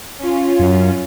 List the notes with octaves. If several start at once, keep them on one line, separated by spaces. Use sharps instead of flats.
C#4 F4
F#2